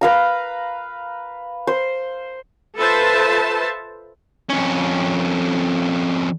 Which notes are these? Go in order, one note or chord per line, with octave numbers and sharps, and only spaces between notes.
B4 F5 A#5
C5
F4 A4 B4 C5 E5 A5
F2 C#4